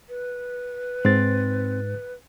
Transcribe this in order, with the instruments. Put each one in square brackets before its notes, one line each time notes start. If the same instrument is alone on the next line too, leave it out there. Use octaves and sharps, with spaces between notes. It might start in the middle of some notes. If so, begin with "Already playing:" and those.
[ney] B4
[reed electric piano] G#2 A6 [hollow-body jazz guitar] C4